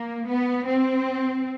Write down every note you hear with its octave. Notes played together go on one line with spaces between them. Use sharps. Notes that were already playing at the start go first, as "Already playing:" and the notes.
Already playing: A#3
B3
C4